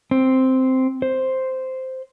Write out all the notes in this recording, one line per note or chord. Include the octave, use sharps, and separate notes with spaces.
C4
C5